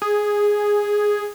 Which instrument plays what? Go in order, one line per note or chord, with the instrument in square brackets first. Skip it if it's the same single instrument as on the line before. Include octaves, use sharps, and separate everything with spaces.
[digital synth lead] G#4